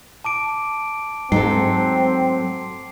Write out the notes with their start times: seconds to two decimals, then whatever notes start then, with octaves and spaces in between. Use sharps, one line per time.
0.24 A5 D6 D7
1.32 G#2 F#3 A3 C4 A4 C7